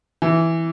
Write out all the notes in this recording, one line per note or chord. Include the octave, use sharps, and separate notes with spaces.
E3